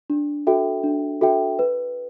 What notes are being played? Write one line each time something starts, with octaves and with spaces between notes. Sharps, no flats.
D4
F#4 A4 E5 G5
D4
F#4 A4 E5 G5
B4